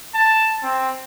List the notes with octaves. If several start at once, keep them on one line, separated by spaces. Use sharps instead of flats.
A5
C4